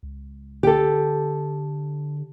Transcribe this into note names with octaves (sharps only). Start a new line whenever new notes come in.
C#2
D3 G4 A4